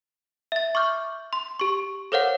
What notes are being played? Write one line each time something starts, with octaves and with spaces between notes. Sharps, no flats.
E5 A6
C#6 D6 F6 G6
C6
G4 C#6
A4 A#4 C5 C#5 F5 F#5